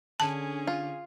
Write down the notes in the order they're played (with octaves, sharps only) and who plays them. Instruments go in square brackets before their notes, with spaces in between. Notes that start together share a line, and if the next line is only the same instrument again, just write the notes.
[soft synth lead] D3 [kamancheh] C#4 G#4 [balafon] A5
[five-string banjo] F4